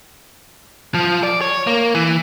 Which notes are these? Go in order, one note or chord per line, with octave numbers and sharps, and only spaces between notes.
F3
D5
C#5
A#3
E3